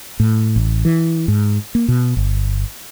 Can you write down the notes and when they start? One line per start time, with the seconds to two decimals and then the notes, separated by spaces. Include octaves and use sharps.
0.20 A2
0.56 A1
0.85 E3
1.28 G#2
1.75 A#3
1.88 B2
2.17 G1